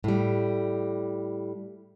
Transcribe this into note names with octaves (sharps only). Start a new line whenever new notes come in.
A2 G3